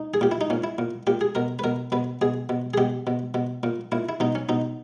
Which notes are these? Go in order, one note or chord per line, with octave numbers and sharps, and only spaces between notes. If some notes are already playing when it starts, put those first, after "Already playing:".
Already playing: D#4
G#4
A#2 G4
E4
D#4
A#2 C#4
E4
A#2
A#2 G4
G#4
B2 A#4
B4
B2 A#4
B2 B4
B2 G#4
B2
G#4
B2 G4
B2
B2
A#2
A#2 E4
E4
B2 D#4
C#4
B2 D#4